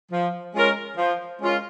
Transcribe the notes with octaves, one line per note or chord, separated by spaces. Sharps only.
F3
G#3 C#4 F4 A#4
F3
G#3 C#4 F4 A#4